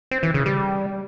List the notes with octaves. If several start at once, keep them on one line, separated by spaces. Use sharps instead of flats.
C4
E3
C#3
G3